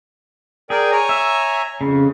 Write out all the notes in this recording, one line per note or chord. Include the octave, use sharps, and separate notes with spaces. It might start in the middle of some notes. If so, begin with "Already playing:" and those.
G#4 A#4 D5 G5
C#5 G#5 A#5
E5
F2 C#3